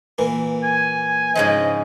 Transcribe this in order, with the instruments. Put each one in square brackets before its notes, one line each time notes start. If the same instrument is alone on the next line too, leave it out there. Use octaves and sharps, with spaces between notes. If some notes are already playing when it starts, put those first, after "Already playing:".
[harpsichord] A#2 E3 A#3
[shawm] G#5
[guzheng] G#2 C#3 F3 [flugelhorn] D#5